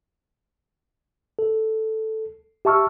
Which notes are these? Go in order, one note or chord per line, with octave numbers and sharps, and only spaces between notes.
A4
G4 E5 A5 C#6 E6 F6